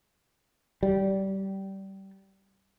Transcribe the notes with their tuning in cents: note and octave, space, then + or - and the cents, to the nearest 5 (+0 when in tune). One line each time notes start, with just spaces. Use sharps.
G3 -20